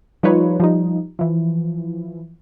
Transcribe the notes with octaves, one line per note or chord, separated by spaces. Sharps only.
F3 G3 D#4 F4 B4 C#5
F3 G3 D#4
E3 F3